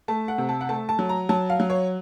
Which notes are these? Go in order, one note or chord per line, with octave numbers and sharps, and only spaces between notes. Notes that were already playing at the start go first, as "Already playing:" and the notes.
A3 A5
F#5
C3
A5
F#5
A3 A5
A5
F#3
A#5
F#3 A5
F5
F#3
C#5